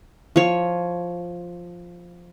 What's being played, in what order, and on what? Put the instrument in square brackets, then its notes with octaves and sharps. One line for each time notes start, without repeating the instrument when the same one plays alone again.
[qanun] F3 C#5